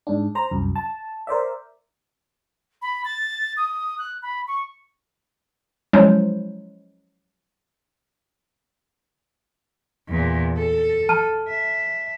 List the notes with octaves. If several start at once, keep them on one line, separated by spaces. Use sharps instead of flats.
G#2 D4
C5 A#5
C2 F#2
A5
A#4 C5 D5 E5
B5
A6
D#6
F#6
B5
C#6
F3 F#3 G#3 C#4 E4 C5
E2 A#2
A4
A5 F6 D#7
E5